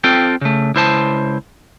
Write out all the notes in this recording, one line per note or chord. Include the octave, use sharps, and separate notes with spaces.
C4 F4 A4 G5
C#3 A3
C#2 E4 C5 A5